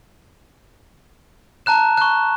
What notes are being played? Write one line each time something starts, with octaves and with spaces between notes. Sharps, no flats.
A5 A#5 F#6 E7
C#6 F#6